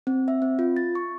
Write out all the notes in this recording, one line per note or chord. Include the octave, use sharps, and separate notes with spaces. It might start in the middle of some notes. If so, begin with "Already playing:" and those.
C4
E5
C4
F4
A6
C#6